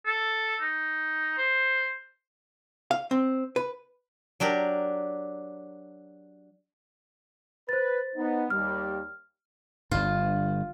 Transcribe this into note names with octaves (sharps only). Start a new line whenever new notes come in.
A4
D#4
C5
F5
C4
B4
F#3 D4 G4 A#4
B4 C5 A6
B3 D#4
D#2 G3 F6
G1 G2 F4